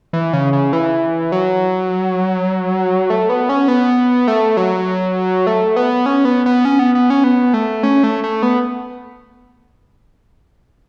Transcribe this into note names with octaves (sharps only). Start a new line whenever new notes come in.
E3
C#3
C#3
E3
F#3
A3
B3
C#4
B3
A3
F#3
A3
B3
C#4
B3
B3
C#4
B3
B3
C#4
B3
A3
C#4
A3
A3
B3